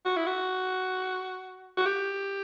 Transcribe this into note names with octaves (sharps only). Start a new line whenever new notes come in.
F#4
E4
F#4
F#4
G4